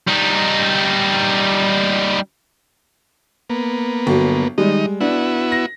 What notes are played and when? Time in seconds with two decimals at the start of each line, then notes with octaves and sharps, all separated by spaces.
0.07 G3 D#4
3.50 A#3 B3
4.07 G1 F#3
4.58 D#3 G3 G#3 D#4 D#5
5.01 B3 D4 E4 F#4
5.52 A#6